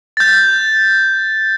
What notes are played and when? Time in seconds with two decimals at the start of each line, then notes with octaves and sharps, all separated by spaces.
0.17 G6 A6